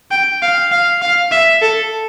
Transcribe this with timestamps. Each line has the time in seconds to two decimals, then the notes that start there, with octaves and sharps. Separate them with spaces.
0.11 G5
0.42 F5
0.71 F5
1.02 F5
1.32 E5
1.62 A4